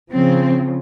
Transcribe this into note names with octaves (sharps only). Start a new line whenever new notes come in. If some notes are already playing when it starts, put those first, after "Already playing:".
C#3 F3 C4